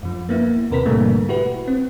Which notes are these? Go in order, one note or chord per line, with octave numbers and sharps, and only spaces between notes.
F#2 F3
A#3 B3 E4
D#2 C3 A#4 B4 B6
G#2 B2 D3 G3 A3 A#3
E4 F#4 G4 B4
C4